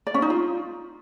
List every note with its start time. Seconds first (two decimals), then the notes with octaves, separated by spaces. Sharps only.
0.07 D5
0.14 C#4
0.22 D#4
0.30 F4